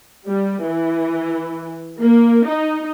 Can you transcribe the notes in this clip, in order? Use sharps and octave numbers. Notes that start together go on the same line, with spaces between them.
G3
E3
A#3
D#4